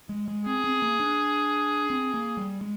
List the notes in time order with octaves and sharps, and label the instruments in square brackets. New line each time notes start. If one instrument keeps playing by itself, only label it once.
[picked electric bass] G#3
G#3
[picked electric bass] C4 [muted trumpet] G#4
[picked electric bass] C4
A#3
D4
C4
A#3
G3
G#3